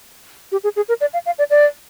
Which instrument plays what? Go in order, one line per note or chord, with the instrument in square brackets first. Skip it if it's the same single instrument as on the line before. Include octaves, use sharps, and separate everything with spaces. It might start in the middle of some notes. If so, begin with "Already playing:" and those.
[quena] G4
G#4
G#4
A#4
D5
F5
F5
D5
D5